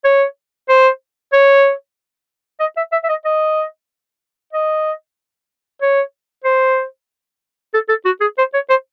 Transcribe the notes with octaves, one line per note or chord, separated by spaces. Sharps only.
C#5
C5
C#5
D#5
E5
E5
E5
D#5
D#5
D#5
C#5
C5
A4
A4
F#4
G#4
C5
C#5
C5